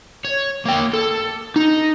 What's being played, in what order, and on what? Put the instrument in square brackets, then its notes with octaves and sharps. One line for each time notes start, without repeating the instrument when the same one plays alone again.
[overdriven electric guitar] C#5
A#3 G5
A4
D#4